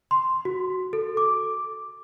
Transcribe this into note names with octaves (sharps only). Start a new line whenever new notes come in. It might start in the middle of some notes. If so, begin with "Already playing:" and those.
C6
F#4
A4
D6